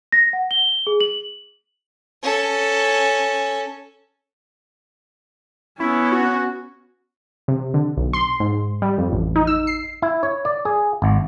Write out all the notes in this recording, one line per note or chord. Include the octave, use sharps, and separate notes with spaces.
A#6
F#5
G7
G#4
F#7
C#4 A4
B3 C#4 E4
F#4
C3
D3
B1
C6
G#2
G3
F2
A1
D#4
E6
C7
E4
C#5
D5
G#4
G#1